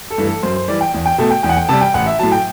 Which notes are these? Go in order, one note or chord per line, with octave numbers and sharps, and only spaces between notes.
A4
G2 E3 A3
A4
F#2 C5
C5
E3 G3 D5
G5
E2
G5
B2 A3 A5
G5
E2 G5
F#5
G5
C3 G3 A5
G5
A1 F#5
E5
A2 F#3 A5
G5